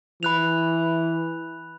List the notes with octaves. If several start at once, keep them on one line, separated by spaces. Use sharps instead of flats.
E3 B5 F#6 F7